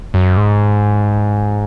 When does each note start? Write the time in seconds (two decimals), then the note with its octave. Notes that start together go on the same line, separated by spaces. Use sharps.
0.14 F#2
0.37 G#2